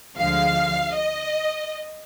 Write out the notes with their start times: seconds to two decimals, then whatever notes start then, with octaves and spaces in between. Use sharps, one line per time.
0.18 D2 D3 F3 G#3 F5
0.94 D#5